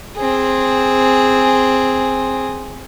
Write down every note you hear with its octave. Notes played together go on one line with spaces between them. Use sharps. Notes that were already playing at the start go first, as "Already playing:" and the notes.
C4 G#4